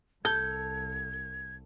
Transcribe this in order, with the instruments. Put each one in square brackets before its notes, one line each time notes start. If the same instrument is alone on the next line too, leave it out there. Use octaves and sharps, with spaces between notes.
[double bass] C2 [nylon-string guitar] A4 [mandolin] G6 [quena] G#6